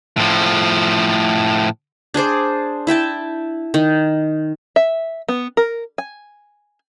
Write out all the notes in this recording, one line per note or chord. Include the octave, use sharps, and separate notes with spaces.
A2 F3
D4 G#4 C5 D5
E4 E5 G5 A5
D#3
E5
B3
A#4
G#5